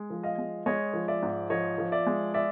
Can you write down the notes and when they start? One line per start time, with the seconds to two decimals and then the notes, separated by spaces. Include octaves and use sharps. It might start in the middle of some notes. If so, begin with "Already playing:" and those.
Already playing: G#3
0.10 F3
0.23 D#5 F5
0.38 G#3
0.66 G#3 C#5 D#5
0.93 F3
1.08 D5 E5
1.23 G#2
1.50 F3 C#5 D#5
1.78 F3
1.92 D5 E5
2.06 G#3
2.34 D5 E5